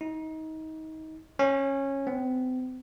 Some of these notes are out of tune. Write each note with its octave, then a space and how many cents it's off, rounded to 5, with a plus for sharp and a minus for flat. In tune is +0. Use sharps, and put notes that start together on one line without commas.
D#4 +25
C#4 -15
C4 -40